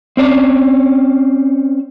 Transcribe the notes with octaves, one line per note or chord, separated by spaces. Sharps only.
C4 C#4 D5